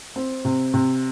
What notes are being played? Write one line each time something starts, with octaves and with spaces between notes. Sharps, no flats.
C4
C3
C3